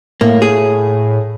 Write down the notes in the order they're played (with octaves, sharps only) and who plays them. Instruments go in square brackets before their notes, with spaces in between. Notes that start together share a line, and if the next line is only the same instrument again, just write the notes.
[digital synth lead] A2 [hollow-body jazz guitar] A#3
[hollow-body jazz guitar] G#4